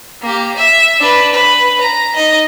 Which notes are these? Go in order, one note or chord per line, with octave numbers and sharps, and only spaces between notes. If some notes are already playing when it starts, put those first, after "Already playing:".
A#3 G4
E5
D4 B4
B4
A#5
D#4 D#5